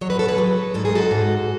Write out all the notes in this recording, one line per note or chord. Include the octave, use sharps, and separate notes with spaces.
F#3 C#5
B4
A4
G#4 B4
F#3
G#2 A4
G#4
F#4 A4
G#2